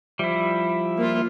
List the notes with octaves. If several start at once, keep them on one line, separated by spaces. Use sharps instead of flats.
F3 G3 E4 E5
A#3 F4